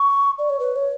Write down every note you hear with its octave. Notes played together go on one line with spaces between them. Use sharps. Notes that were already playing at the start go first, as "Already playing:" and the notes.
Already playing: C#6
D5
C#5
B4
C#5